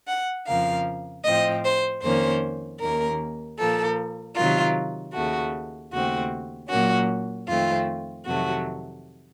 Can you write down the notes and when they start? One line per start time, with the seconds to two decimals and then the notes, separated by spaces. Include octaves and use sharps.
0.08 F#5
0.48 F2 C#3 F3 A#3 F5
1.25 A2 F3 C4 D#5
1.64 C5
2.03 F2 D#3 A#3 C#4 C5
2.81 D#2 D#3 A#3 C#4 A#4
3.59 A#2 F3 A#3 A4
4.37 C3 D#3 F#3 A#3 F4
5.14 D#2 C#3 A3 F#4
5.92 D#2 C#3 A3 C4 F#4
6.70 A#2 F#3 A#3 C#4 F#4
7.48 F2 D#3 A3 C4 F4
8.26 F2 C3 D#3 F#3 A3 F#4